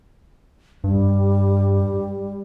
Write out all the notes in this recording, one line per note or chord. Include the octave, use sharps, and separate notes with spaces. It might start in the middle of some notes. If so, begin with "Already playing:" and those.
G2 G3